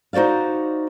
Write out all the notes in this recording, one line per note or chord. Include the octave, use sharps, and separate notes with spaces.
D#4 F#4 C5 D5 F5